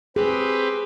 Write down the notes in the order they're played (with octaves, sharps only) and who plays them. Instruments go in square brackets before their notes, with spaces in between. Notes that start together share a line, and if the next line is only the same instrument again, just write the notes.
[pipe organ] C4 G4 B4 [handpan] G#4